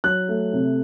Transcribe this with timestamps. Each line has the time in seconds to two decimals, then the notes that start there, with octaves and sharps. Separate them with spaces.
0.04 F#3 F#6
0.29 A3
0.53 C3